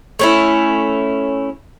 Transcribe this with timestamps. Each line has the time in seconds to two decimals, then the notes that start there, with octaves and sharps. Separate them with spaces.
0.19 A3 C#4 E4